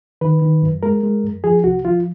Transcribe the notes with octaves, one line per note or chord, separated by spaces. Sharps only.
D#3 B4
D#3
F#2
G#3 A#4
G#3
F#2
F3 G#4
C2 F#4
F3 F4